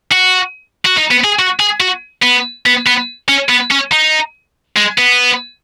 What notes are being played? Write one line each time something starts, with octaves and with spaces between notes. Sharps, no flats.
F#4
F#4
D#4
B3
G#4
F#4
G#4
F#4
B3
B3
B3
C#4
B3
C#4
D#4
G#3
B3